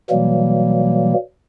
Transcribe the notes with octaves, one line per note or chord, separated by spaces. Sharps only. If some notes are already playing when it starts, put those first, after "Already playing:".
B2 E3 F#3 G3 A#3